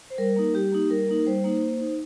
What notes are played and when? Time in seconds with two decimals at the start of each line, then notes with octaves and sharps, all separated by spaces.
0.10 C5
0.18 G3 A#4
0.36 A#3 D#4
0.54 G3 G4
0.72 A#3 D#4
0.90 G3 A#4
1.09 A#3 D#4
1.27 G3 C5
1.44 A#3 D#4
1.63 A#3
1.81 D#4